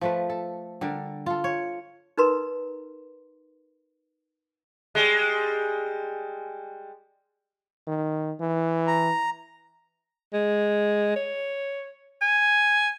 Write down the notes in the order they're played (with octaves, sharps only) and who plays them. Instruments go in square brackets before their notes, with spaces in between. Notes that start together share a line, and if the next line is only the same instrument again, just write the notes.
[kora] F3 A3 B4
A4
D3 G3 A#4
F4 A4
C#5
[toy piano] D#4 A#4 B4 A#5 C6
[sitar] G3 G#3
[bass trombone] D#3
E3
[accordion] A#5
[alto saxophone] G#3
C#5
G#5